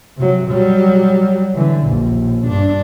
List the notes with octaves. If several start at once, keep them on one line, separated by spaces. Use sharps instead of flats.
C3 F#3
F#3 G3
D3 E3
A#1 D#2
G2 D4